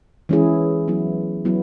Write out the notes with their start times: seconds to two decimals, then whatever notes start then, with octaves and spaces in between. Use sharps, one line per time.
0.29 E3 G#3 C#4 E4 G#4
0.88 F#3 B3 E4
1.45 F#3 B3 E4